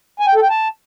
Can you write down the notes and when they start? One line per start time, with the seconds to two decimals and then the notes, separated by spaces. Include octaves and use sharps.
0.20 G#5
0.27 G5
0.35 A4
0.43 G5
0.50 A5